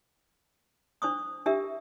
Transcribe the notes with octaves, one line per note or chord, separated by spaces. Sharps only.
D4 C5 C#6 D#6
D4 G4 A#4 E5